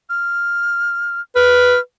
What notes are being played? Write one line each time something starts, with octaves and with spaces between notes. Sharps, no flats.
F6
B4 F6